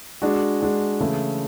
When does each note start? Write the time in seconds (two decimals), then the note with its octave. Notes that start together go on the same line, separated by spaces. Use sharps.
0.22 G#3 D4 F#4
0.61 G#3 D4 F#4
1.00 C#3 E3 A3 E4